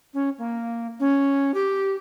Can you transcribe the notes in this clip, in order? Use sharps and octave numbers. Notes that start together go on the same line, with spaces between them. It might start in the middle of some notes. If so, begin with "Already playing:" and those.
C#4
A#3
C#4
G4